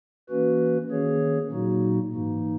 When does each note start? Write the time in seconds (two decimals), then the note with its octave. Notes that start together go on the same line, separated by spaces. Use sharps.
0.29 E3 A#3 C#4 F#4 B4
0.90 D#3 A#3 C#4 G#4 C#5
1.50 A#2 F#3 A#3 D#4 F#4
2.12 G#2 E3 A#3 D#4